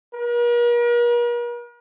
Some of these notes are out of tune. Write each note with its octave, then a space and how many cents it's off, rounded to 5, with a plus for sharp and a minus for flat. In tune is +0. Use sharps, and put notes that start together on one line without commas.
A#4 +45